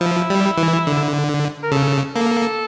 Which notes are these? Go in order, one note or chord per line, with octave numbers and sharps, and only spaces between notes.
F3 E4
G3
E3
D3
A#4
C#3 A4
A#3 A4